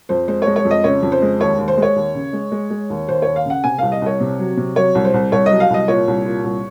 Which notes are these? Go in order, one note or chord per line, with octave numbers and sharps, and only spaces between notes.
F2 C5
G#3 C5
G#3 C#5
C#5
F2
D#5
C#3 C#5
F2
C5
G#3
D#2 C#5
D#2
C5
G#3
C#5
D#2
C#3
G#3
G#3
G#3
D#2
D#2 C5
D#2 C#5
F5
C#3 F#5
C3 G#5
C2 F5
D#5
C2 C#5
C3
F#3
C3
F#3 C#5
C2
C5
C2
C2 C#5
F#3 D#5
F5
C2 D#5
A#2 C#5
C2
A#2
C2